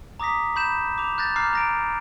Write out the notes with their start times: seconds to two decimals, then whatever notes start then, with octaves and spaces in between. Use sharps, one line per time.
0.20 A#5 D6 D#6 A#6 B6
0.56 B5 G6 E7
0.98 D6 F7
1.18 F#6 G6 A6 A#6
1.36 A#5 D6 F6 F#6 C7
1.53 A#5 A#6 D7